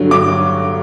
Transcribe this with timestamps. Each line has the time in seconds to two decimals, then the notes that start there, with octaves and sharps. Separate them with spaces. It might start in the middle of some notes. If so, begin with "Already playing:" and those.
Already playing: G2 D3 F#3
0.11 D6